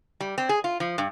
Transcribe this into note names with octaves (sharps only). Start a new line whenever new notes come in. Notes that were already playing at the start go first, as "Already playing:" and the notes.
G3
C4
G#4
F4
F3
G2